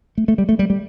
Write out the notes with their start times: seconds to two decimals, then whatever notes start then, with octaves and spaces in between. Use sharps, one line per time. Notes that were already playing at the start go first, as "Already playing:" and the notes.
0.18 A3
0.28 A3
0.38 G3
0.49 A3
0.59 G3
0.70 G3